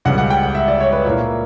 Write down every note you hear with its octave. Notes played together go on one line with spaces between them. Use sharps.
C#2 C#3 G3 F#5
F#5
G5
F#5
E5
D5
C#5
B4
A#2 A#3 E4 C#5